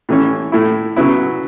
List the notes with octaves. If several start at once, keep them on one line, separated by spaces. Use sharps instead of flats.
A2 E3 C#4
A2 A3 E4
C#3 F#3 B3 E4